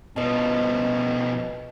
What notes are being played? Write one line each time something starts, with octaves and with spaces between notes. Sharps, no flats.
B2 F3 B4 D#5 A5